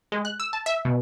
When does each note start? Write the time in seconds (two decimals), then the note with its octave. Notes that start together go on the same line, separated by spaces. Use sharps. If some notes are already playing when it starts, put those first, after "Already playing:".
0.12 G#3
0.25 F#6
0.40 E6
0.53 A5
0.66 E5
0.85 B2